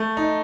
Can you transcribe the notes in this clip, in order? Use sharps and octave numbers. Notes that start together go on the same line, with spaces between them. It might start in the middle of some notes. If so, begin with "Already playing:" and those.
Already playing: A3
D#4